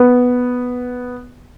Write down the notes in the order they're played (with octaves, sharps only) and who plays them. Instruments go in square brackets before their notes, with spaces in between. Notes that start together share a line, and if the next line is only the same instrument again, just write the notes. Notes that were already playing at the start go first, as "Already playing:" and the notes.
Already playing: [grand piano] B3